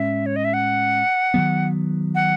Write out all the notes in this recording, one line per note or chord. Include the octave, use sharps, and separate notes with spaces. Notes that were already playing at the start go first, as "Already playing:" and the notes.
Already playing: A2 G#3 C#4 E5
C#5
D#5
E5
F#5
D#3 F#3 B3
F#5